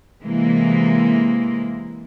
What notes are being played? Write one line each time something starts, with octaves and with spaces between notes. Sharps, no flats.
C3 E3 G#3 A#3